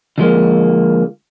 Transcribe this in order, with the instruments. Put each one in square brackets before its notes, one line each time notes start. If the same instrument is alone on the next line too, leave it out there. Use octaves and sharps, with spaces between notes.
[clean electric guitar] D3 F3 G#3 A#3